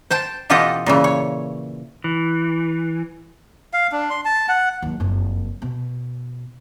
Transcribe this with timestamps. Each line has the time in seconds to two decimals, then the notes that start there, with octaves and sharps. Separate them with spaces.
0.10 C5 G5 A5
0.50 B2 E3 F4 G4 A4 D#5
0.86 A#2 C#3 E3
1.04 C#5
2.04 E3
3.73 F5
3.92 D4
4.10 C6
4.25 A5
4.49 F#5
4.82 D#2 F#3
5.00 F#1 F2
5.62 B2